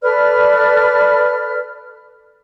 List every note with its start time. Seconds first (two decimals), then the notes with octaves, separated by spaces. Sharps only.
0.03 A4 B4 D5 F6